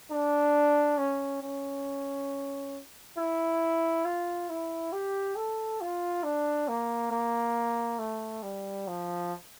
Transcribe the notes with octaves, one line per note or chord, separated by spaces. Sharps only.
D4
C#4
C#4
E4
F4
E4
G4
A4
F4
D4
A#3
A#3
A3
G3
F3